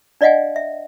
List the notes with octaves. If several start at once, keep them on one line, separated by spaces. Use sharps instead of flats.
D4 D5 D#5 F5 F#5 G#5
E5